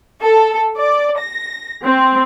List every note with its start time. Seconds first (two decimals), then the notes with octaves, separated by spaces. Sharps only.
0.21 A4
0.78 D5
1.19 A#6
1.84 C4